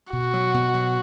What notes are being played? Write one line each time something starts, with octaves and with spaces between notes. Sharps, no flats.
B2 F#4
F#3
B2
F#3